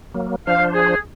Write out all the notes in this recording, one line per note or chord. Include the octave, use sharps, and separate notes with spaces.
F#3 A#3
F3 D4 C5 F5
G#4